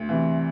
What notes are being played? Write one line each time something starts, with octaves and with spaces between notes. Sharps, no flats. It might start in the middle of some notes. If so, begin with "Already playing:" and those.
Already playing: D2
C3 E3